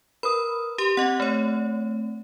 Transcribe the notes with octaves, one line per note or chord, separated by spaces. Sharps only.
A#4 B4 B5 D#6
G4 C6
C4 D#5 F#5
A3 C#5